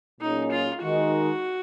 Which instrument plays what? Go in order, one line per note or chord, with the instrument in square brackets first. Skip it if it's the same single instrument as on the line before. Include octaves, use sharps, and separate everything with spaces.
[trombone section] A#2 F#3 A#3 C#4 G#4 [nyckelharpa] D#4
[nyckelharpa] F4
[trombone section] D#3 G#3 D#4 A#4 [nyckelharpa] F#4